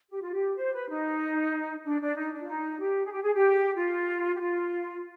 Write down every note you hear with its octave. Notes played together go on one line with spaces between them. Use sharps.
G4
F4
G4
C5
B4
D#4
D4
D4
D#4
D4
F4
D#4
G4
G#4
G4
G#4
G4
F4
G4
F4